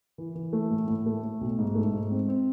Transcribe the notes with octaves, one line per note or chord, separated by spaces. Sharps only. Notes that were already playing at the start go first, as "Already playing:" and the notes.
E3
E3
A3
A2
A2
A3
A2
B1
G#2
A3
G#2
C4
C4